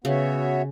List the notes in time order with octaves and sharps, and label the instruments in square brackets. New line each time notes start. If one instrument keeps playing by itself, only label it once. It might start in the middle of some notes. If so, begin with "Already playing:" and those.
[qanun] C#3 [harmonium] B3 F#4 C#5 E5